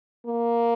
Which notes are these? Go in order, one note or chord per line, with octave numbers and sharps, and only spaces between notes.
A#3